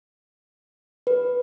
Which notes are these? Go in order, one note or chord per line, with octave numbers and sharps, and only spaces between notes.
B4